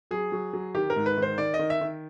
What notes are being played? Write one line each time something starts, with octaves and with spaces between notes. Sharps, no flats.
F#3 G#4
F#3
F#3
D#3 G4
A#4
G#2
B4
D#3 C5
D#3 D5
D#5
D#3
E5
D#3